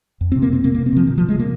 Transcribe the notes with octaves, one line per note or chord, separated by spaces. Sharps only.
F2
C3 C4
A#3
C3 C4
C3 A#3
C3 A#3
C4
C3 F3
C3 D#3
C3 F3
G#3
C3 A#3